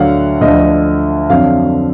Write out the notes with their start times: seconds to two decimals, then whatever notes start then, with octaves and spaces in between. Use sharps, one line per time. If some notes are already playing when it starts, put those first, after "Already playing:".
Already playing: D2 D3 F#3 F5 F#5
0.41 D2 D3 F3 D#5
1.30 F2 D3 F#3 F5